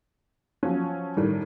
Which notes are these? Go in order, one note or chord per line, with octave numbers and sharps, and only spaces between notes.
F3 F#3 C#4
A2 D#3 G3